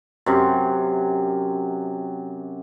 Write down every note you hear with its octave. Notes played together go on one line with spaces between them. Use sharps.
F#2 C3